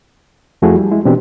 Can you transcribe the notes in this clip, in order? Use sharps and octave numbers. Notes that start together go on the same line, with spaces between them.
F2 F3 A3 E4 F#4 G#4
G3
G#3 E4
B2 E3 C4 D4 G4